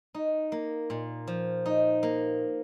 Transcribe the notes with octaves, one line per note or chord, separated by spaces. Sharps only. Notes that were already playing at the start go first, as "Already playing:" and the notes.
D#4
A#3
A#2
F3
D#4
A#3